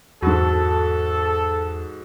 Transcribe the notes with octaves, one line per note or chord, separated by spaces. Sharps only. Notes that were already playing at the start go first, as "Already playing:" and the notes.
E2 G#2 F#4 A4